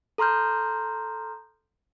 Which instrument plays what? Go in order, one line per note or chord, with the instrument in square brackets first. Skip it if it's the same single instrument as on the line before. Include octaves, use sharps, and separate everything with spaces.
[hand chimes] A4 A#5 C6 F6 G6